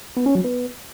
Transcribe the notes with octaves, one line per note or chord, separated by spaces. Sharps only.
B3
C#4
F#3
B3